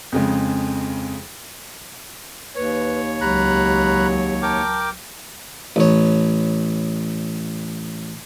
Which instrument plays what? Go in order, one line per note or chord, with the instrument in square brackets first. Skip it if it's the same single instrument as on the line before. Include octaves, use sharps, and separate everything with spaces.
[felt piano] F2 C#3 G#3
[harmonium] D#2 C#5 [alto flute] B4
[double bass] C#2 F#3 [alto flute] G4 [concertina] A#5 B5 F#6
[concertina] A#4 G5 D6 [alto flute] A5
[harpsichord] A1 C#5